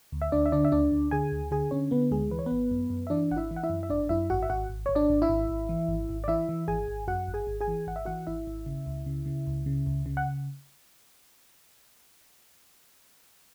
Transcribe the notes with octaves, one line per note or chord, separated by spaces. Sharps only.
D2
E5
D2 D4 D5
E5
D3 D4 D5
E5
D2 D4 D5
D2
D3 G#4 G#5
D2
D3 G#4 G#5
D3 C#4 C#5
D3 B3 B4
D2 G#3 G#4
E3 B4
C#5
G#1 B3 B4
F#2
F#2
E5
E3 D4 D5
G#1 F#5
E4 E5
E3
F#5
E4 E5
F#2
E5
G#1 D4 D5
F#2 E4 E5
G#1 F#4 F#5
E5
G#1 F#4 F#5
G#1
G#1 C#5
D4 D5
G#1
E4 E5
G#1
G#1
E3
G#1
G#1
D5
E3 E4 E5
E3
G#1 G#4 G#5
G#1
F#2 F#4 F#5
G#1
G#4 G#5
G#1
G#4 G#5
E3
G#1 F#5
E5
E3 F#4 F#5
G#1 E4 E5
G#1
C#3
C#2
C#3
C#3
C#2
C#3
C#2
C#3
F#5